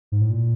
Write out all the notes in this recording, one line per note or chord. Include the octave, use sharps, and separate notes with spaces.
G#2
A2
A#2